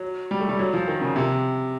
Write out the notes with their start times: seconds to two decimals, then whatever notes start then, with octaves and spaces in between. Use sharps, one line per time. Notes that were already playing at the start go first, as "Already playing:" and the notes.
Already playing: F#3
0.31 G3
0.40 A3
0.49 G3
0.59 F#3
0.74 F3
0.88 D#3
1.01 C#3
1.16 C3